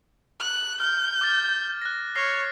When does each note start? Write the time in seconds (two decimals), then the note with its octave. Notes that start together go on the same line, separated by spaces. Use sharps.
0.40 F#6
0.80 F6 G6
1.21 D6 F6 A6
1.82 F#6 A#6
2.16 C#5 F6 A#6 C7